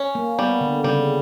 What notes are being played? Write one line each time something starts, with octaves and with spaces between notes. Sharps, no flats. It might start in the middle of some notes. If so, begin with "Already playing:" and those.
Already playing: C#4
A#3
G3 B3
D3
C#3 G3